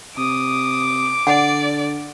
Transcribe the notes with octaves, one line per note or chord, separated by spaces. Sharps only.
C3 D6 D#6
D3 D5 F#5